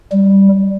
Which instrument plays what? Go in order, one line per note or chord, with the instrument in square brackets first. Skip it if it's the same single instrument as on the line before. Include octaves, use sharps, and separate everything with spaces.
[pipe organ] G3